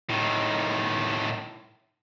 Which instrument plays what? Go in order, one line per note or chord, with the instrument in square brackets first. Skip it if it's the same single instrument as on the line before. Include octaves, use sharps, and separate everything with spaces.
[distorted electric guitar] A2 D#3